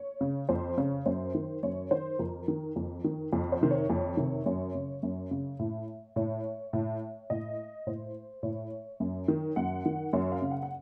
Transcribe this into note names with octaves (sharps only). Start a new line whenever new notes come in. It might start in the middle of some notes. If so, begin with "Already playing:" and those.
Already playing: C#5
C#3
F2 C5
C#3 C#5
F#2 C5
D#3
F#2 C#5
D#3 C5
F2 A#4
D#3
F2
D#3
F2
C5
C3 D#3
C#5
F2
C3 D#3
F#2 C#5
C#3
F#2
C#3
A2
A2 C#5
A2
A2 D#5
A2 C5
A2 C#5
F#2
D#3
F#2 F#5
D#3
F#2 C#5
F5
C#3
F#5
F#5